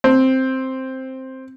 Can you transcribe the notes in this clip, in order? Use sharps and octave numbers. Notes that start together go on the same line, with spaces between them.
C4